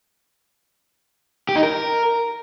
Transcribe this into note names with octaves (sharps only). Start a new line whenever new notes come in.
G4
D#4
A#4